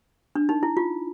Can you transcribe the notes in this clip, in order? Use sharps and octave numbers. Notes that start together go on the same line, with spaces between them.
D4
D#4
E4
F4